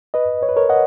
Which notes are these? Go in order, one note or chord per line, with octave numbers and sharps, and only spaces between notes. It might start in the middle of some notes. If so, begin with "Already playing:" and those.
B4 D#5
C#5
B4
A#4 C#5
D#5 F#5